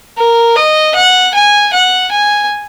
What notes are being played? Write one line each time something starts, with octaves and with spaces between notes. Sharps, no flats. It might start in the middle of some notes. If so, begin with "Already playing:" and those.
A#4
D#5
F#5
G#5
F#5
G#5